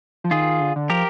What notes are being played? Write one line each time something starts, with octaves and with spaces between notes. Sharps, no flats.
F3
D#3 F4 G#4
D3
D3
F3 G4 A#4